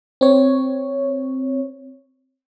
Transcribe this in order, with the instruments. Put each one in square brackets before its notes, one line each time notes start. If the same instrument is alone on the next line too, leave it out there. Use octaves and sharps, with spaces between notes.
[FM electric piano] C4 C#5